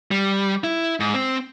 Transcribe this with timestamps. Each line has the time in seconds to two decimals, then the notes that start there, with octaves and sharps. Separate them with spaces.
0.11 G3
0.64 E4
1.00 G#2
1.14 C4